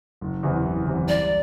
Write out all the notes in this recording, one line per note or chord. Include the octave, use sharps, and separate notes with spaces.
F#1
E2 C3 E3
F#1
E2 C3 E3
C2 D5